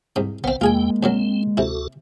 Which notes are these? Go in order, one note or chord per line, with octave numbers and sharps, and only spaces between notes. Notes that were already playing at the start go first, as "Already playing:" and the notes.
C2 G#2 D#6
A#1 B3 C4 C5 F5
E2 G#3 A#3 F4 G#4 G5 G#5
C#2 A#2 F#3 C4
D2 C3 E4 F#4 A4